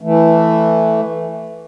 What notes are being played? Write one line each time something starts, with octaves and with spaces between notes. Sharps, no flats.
E3 A3